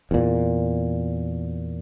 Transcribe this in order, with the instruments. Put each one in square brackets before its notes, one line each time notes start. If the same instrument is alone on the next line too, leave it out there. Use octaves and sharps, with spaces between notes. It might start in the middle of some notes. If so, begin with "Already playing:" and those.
[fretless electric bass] E2 A#2